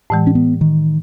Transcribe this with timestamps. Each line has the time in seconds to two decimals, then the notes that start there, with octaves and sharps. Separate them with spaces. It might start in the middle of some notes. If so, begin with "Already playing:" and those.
0.10 A2 E3 G#3
0.27 C#4
0.35 B3
0.61 D#3